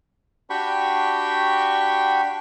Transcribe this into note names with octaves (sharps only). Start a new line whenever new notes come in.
D4 F#4 G4 G5 B5 C#6